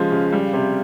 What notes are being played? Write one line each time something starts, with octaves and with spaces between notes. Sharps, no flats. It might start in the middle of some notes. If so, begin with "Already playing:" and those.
Already playing: C#3 F3 G#3 F5
C#3
G3
C3